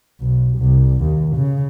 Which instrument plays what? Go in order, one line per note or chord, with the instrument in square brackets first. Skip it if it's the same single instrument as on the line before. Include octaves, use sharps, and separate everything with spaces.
[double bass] B1
C2
D#2
C#3